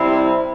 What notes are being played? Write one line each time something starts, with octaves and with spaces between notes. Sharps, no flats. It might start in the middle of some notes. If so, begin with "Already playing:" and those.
Already playing: C3 G3 C4 E4